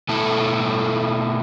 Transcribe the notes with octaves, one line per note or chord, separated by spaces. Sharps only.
B2 A3 E4 A4